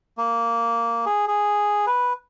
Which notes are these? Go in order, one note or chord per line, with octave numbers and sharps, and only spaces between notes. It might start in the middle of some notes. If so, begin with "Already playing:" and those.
A#3
G#4
G#4
B4